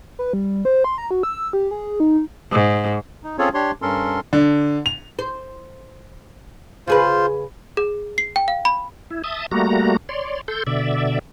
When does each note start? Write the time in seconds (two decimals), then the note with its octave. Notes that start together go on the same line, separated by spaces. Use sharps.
0.19 B4
0.33 G3
0.65 C5
0.84 C6
0.98 A#5
1.11 F#4
1.23 E6
1.53 G4
1.71 G#4
2.00 D#4
2.52 G#2
3.24 D#4
3.39 C4 C#4 F4 G#4 A4 C#5
3.54 D4 G4 C#5 C6
3.82 G2 C#4 A4 A#4 C6
4.33 D3
4.86 F7
5.19 C5
6.87 C#3 F4 G#4 B4 C5
7.77 G#4
8.18 C7
8.36 G5
8.48 F5
8.65 B5
9.11 E4
9.24 E5 A5 D#6
9.51 G3 A3 A#3 F#4 A#5
10.09 C#5 D5 C6
10.48 A4 C6 G6
10.67 B2 D3 D5 E5